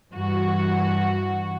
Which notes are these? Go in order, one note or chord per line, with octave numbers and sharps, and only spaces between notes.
G2 E3 F#4